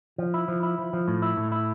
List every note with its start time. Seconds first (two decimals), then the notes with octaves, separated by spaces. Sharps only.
0.18 F3
0.34 E4
0.48 F3
0.63 E4
0.78 F3
0.93 F3
1.08 A2
1.22 E4
1.37 A2
1.52 E4